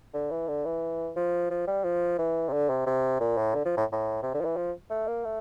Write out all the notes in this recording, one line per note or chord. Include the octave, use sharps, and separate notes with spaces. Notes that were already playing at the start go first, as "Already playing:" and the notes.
D3
E3
D3
E3
F3
F3
G3
F3
E3
C3
D3
C3
C3
A#2
A2
D3
F3
A2
A2
C3
D3
F3
E3
F3
A3
A#3
A3